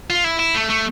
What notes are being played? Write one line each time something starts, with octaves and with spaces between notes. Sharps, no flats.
F4
E4
E4
A3
A3